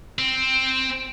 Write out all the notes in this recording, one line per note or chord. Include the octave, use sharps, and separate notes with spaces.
C4